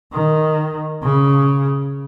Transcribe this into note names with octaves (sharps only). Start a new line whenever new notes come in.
D#3
C#3